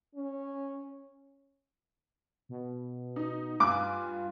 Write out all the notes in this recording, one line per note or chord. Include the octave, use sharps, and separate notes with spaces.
C#4
B2
D#4
G2 F4 G#5 D6 F#6